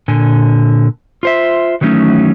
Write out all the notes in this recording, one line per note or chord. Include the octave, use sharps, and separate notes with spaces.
A#2 D3 G#5
F4 C5 E5
D#3 E3 F#3 A3 C#4 D#4